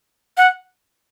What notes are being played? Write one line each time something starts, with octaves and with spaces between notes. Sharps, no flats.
F#5